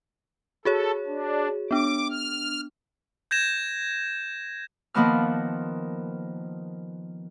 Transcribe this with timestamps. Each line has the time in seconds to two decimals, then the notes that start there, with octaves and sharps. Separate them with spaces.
0.65 F#4 G#4 A4 C#5
1.06 D4
1.71 B3 D4 D6
2.10 F6
3.31 G6 G#6 A#6 E7
4.94 D#3 F3 A#3 B3 A5 F6